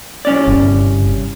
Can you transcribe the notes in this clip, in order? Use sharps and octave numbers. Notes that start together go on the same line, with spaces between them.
C2 C#4 D5
G1